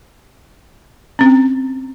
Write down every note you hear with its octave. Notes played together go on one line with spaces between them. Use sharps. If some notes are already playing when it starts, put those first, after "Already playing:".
C4 C#4